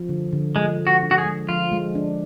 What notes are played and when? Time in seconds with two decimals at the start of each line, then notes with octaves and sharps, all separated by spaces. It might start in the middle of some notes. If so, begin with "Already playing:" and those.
Already playing: F3
0.09 D3
0.33 D3
0.56 F3 G#3
0.79 G#3
0.87 F#4
1.02 D4
1.11 F#4
1.18 G#4
1.26 G#3
1.49 F3 F4
1.72 G#3
1.95 D4